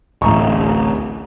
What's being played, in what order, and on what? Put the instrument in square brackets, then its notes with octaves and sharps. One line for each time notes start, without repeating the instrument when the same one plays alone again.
[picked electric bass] D1 [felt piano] A1 A#5 C#6